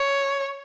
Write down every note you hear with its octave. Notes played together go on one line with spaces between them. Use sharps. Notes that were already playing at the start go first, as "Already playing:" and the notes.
Already playing: C#5